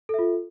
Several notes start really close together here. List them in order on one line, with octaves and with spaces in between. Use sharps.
A4 E5 F4